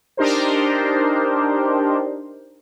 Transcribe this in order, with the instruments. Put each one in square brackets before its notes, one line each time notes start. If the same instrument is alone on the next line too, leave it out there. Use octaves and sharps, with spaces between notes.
[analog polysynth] D4 D#4 G4 A#4 C5